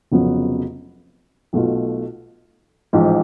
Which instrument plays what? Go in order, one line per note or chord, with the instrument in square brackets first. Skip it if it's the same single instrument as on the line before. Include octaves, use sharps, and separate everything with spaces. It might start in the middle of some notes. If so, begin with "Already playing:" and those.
[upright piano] F1 F2 C#3 F#3 B3
B1 B2 A3 F4
A1 G#2 F3